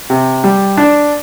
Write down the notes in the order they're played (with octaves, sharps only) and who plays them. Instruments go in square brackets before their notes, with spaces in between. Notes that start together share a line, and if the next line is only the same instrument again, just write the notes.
[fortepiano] C3
G3
D4